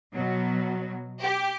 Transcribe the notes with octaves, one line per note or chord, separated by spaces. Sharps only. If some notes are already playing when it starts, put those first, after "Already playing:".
B2 F#3
G4